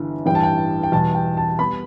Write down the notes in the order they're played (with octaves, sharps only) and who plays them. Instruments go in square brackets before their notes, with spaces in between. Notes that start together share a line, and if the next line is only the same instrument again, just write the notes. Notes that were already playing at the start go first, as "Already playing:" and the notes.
Already playing: [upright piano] G1 G2 E3
A1 G2 E3 G3 G5
A5
G5
G5
E2 B2 G3 A5
G5
A5
G3 B3 B5